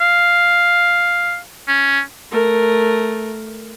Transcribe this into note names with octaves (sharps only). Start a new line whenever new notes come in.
F5
C#4
A3 A#4